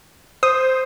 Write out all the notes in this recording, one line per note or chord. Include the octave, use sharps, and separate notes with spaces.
C5 D#6